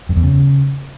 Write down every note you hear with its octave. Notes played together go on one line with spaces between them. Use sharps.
F#2
E2
C#3